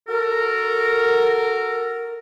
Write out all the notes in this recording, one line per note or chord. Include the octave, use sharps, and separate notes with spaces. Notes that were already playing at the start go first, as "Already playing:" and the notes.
F#4 A4 A#4